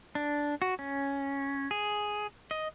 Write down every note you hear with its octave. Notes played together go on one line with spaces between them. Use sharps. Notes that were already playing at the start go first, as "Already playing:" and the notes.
D4
F#4
C#4
G#4
D#5